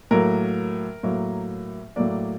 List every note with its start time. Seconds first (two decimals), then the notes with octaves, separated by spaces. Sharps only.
0.11 A2 F#3 A#3 A#4
1.03 A2 F#3 A#3
1.96 A2 F#3 A#3 D5